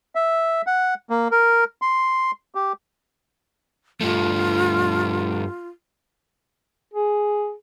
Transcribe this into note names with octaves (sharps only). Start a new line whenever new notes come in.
E5
F#5
A#3
A#4
C6
G4
G2 A3 F4
G#4